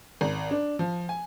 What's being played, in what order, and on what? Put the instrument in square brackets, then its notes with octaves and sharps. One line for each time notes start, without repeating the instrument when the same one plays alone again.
[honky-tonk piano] G#1
D4
F3
G#5